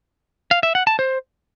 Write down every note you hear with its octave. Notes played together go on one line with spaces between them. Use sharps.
F5
E5
F#5
A5
C5